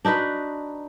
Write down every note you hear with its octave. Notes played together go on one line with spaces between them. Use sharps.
D4 D#4 F#4 B4